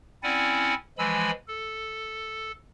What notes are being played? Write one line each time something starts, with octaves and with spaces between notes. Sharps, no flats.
C4 C#4 E4 D5 F#5 G#5
E3 F3 G#3 G#5 B5 E6
A4